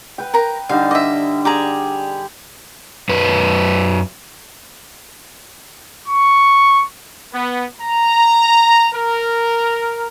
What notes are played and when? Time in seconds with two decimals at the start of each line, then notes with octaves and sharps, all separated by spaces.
0.18 B4 G5
0.34 A#4 A#5
0.69 D3 G3 D#4 F5
0.91 D#5 E5 D6
1.45 G4 G#4 A#5 D6
3.09 F#2 F#3 B4
6.08 C#6
7.33 B3
7.81 A#5
8.94 A#4